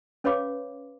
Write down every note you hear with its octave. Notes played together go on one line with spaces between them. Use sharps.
C#4 B4 C#5 F5 B5 D6